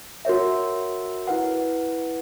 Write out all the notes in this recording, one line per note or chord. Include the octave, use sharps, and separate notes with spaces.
F#4 A#4 C#5 E5
E4 B4 F#5